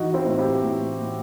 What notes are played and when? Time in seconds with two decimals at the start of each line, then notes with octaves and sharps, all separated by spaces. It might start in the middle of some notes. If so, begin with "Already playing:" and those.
Already playing: E3 D#4 F#4
0.14 C4 E4
0.26 A2
0.39 E4 G4
0.63 A2
1.01 A2